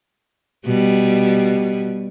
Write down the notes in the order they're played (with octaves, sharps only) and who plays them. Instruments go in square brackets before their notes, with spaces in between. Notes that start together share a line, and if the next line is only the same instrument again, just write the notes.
[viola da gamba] B2 G3